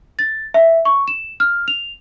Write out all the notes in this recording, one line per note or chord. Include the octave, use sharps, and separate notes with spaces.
A6
E5
C#6
E7
F6
F7